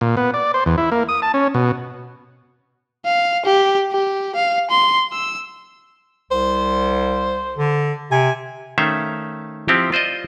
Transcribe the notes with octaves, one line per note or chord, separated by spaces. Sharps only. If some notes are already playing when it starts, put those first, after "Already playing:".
A#2
B3
D5
C5
E2
E4
A#3
D#6
A5
C#4
B2
F5
G4
G4
F5
C6
E6
C2 C5
D3
C3 G#5
D#3 A3 C#4 C5 E5 F5
F3 C4 E4 G4
F4 C5 D5 D#5